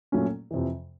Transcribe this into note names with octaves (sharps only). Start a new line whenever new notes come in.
A#2 F#3 A3 C#4
F2 C3 E3